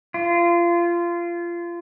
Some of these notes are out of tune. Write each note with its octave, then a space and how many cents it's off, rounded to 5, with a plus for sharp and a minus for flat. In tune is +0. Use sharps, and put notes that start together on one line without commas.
F4 -25